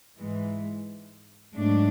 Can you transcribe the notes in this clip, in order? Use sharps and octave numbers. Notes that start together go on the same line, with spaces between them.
G#2 E3 G#3
G#2 F#3 A3 D4